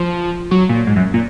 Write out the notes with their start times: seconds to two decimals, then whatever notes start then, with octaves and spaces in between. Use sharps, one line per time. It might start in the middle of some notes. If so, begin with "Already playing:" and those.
Already playing: F3
0.51 F#3
0.69 A#2
0.87 G#2
0.96 F#2
1.14 A#2